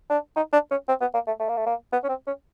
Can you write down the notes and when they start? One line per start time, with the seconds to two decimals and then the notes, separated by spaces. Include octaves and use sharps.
0.10 D4
0.36 D#4
0.53 D4
0.71 C#4
0.88 C4
1.01 B3
1.14 A#3
1.27 A3
1.40 A3
1.49 A#3
1.57 A3
1.66 A#3
1.93 B3
2.04 C#4
2.09 C4
2.27 C#4